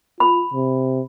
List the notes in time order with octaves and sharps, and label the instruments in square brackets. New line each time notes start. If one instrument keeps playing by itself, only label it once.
[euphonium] F4 [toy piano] B5
[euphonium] C3